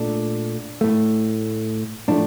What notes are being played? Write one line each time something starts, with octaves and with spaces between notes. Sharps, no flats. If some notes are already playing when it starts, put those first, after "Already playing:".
Already playing: A#2 A3 D4
A2 A3
A2 F3 A3 D4